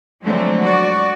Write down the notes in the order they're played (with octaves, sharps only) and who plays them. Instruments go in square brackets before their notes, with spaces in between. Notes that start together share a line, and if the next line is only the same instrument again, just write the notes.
[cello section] D3 F3 F#3 G#3 A3 C4
F#4 D5